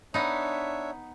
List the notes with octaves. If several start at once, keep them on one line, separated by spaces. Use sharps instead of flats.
B3 D4 D#4 C#5 E5